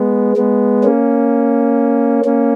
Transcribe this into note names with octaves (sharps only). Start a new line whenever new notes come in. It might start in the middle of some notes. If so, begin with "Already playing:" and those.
Already playing: G#3 B3
G#3 B3
A#3 C#4
A#3 C#4